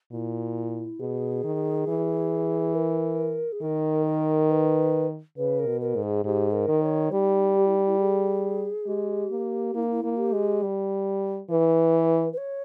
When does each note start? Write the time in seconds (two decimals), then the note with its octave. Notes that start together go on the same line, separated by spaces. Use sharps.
0.12 A#2 E4
1.00 B2 G#4
1.44 D#3
1.87 E3
2.74 A#4
3.52 G#4
3.62 D#3 A#4
4.06 A#4
4.50 B4
5.37 C#3 B4
5.59 A#4
5.66 B2
5.81 A#4
5.96 G#2
6.03 G#4
6.24 G#2 G4
6.54 A#4
6.68 D#3
6.83 C#5
7.12 G3 D#4
7.56 G4
7.66 E4
7.75 D#4
7.85 E4
8.00 G#4
8.87 G#3 G4
9.31 A#3
9.74 A#3 E4
9.83 D#4
9.90 E4
10.04 A#3
10.18 G4
10.33 G#3
10.63 G3
11.49 E3 B4
12.33 B4
12.37 C#5